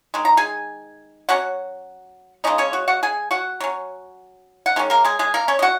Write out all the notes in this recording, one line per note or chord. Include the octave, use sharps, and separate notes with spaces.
D#3 G#3
A#5
G#4 G#5
F#3 C#4 F#4 F#5
C#3 G#3 C#4 D#4 D#5
C#4 C#5
F#4
F#4 F#5
G#4 G#5
F#4 F#5
F#3 C#4
F#5
D#3 G#3 C#4
A#3 A#4
G#3 G#4
G#3 G#4
A#3 A#4
C#4 C#5
D#5
F#4 F#5